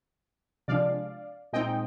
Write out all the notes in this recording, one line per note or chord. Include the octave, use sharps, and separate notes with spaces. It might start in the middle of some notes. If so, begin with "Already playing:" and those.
C3 F3 G#3 D4 D5 F5
A#2 G#3 C4 D#4 D#5 G5